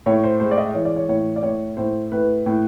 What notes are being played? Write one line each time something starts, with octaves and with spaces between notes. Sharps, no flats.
A2 C#5
C5
G#3 C5
D5
D#5
E3 C#5
D5
C#5
A2 C#5
D5
A2 C#5
A2 C5
A2 B4
A2